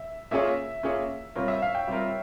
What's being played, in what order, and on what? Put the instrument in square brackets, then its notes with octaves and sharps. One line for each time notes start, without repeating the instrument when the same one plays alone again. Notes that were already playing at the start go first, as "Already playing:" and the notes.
Already playing: [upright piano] E5
[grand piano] A#3 C#4 F4 G#4 C#5 [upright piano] E5
[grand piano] A#3 C#4 F4 G#4 C#5
[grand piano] G3 C4 F4 A#4 [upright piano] C#5
[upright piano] E5
F5
G5
[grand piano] G3 C4 F4 A#4